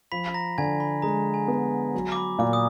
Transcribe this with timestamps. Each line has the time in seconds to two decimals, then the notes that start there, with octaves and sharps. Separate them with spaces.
0.12 F3 B5 B6
0.34 A#5 A#6
0.58 D3 G#5 G#6
0.80 B5
1.02 G#3 A#5
1.34 G#5
1.48 B3
1.94 F#3
2.12 D6
2.16 B5
2.39 A#2 D6
2.53 D#6